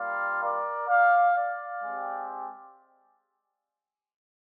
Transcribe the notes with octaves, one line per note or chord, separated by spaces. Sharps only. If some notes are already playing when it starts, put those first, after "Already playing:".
Already playing: G3 A#3 F4 D5 F5
A#4 D5
D5 F5
D5 F5
G#3 C4 G4